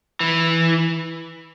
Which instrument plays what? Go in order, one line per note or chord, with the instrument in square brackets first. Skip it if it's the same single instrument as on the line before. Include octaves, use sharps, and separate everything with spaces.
[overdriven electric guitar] E3